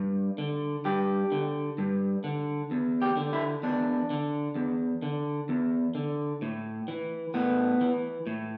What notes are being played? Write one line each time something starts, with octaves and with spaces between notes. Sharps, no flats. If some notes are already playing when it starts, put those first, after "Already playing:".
Already playing: G2
D3
G2 G4
D3
G2
D3
E2
G4
D3
E4
E2 D4
D3
E2
D3
E2
D3
A2
E3
A2 B3
E3
A2